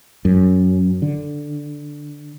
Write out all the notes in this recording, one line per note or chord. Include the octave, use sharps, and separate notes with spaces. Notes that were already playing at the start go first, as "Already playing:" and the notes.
F#2
D3